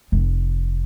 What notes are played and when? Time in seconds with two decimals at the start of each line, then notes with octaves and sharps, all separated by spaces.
0.12 F1